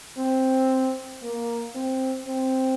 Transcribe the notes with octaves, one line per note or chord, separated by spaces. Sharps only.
C4
A#3
C4
C4